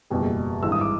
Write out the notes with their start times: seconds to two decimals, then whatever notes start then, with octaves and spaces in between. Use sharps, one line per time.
0.10 F#1 E2 B2 G3
0.62 G#1 G2 E3 E6
0.72 D#6
0.81 D6